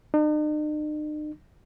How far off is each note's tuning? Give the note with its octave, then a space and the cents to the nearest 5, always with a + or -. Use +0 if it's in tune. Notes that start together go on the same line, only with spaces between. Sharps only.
D#4 -45